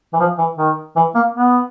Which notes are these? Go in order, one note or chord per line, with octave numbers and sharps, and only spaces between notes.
E3
F3
E3
D#3
E3
A#3
B3